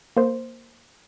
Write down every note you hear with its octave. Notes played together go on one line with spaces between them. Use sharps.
A#3 C5